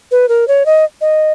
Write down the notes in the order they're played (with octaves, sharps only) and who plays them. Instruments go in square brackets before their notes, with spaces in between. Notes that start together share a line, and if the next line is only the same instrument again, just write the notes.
[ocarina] B4
A#4
C#5
D#5
D#5